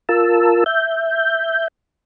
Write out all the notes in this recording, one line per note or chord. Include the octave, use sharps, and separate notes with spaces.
F4 A#4 A5 E6
E5 G6